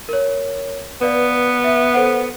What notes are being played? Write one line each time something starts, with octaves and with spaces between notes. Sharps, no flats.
A#4 C#5
B3 B4 D5 F5
E5
A4 C5 F#5